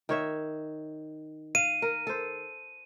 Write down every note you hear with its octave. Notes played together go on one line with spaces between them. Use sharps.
D#3 C#5 E5
F5 D#7
A#4
A4 C5